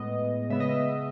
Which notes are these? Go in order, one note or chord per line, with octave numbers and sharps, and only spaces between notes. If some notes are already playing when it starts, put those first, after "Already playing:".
Already playing: A2 G#3 B3 D#5
C#3 G#3 B3 E5
D#5
E5